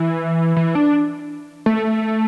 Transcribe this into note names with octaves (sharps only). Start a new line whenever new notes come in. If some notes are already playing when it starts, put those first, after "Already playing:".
Already playing: E3
E3
D4
A3